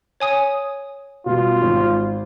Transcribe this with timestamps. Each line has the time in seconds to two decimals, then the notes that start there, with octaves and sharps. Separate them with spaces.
0.20 C#5 G#5 D#6
1.26 B2 G3 F4
1.61 G#1